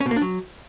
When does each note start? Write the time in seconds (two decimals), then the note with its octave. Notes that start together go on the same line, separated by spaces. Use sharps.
0.01 C#4
0.06 B2
0.11 A#3
0.16 D4
0.21 F#3